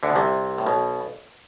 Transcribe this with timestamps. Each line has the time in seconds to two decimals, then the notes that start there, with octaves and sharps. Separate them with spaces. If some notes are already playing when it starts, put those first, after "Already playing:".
0.03 D2 D3
0.10 B2
0.16 C2 C3
0.58 A2
0.66 B1 B2